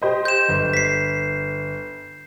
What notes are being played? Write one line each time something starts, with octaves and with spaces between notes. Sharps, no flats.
G4 C5 D#5
G6 E7
G1
B6 C7